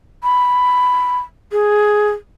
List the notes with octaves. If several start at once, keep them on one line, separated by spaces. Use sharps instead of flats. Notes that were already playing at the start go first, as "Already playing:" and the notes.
B5
G#4